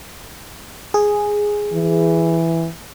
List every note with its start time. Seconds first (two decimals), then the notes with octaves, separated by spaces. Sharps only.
0.94 G#4
1.73 E3